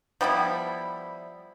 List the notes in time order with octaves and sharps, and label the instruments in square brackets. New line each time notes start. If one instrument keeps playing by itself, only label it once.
[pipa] F3 G3 B3 E4